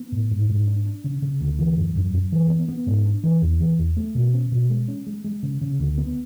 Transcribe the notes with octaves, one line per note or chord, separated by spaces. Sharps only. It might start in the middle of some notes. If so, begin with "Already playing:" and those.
Already playing: B3
A2
G#2
G#2
D4
D4
C#3
C#3
D2
E3
F#2
F#2
F#2
E3
B3
B3
G#2
D4
E3
E2
E3
E2
A3
B2
C#4
B2
G#3
C#4
G#3
G#3
C#3
C#3
D2
B3